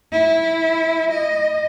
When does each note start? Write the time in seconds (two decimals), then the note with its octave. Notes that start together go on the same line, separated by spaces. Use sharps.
0.12 E4
1.11 D#5